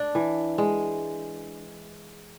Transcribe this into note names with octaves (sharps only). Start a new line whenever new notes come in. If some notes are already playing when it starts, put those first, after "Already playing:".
Already playing: D4
E3
G#3